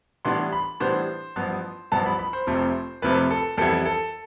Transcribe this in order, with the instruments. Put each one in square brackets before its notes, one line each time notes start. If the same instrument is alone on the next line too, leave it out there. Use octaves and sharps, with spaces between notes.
[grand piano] A2 E3 G3 B3 D4 C6
B5
A2 E3 G3 B3 D4 C5
A1 G2 F3 B3
A1 G2 F3 B3 A5
B5
B5
C5
F1 F2 C3 F3 A3
F1 F2 C3 F3 A3 B4
A4
F2 E3 G3 B3 E4 A4
A4